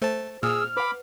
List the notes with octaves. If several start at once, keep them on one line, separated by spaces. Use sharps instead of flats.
A3 C5 A5
A#2 G#4 E6 F6
B4 F#5 B5 D6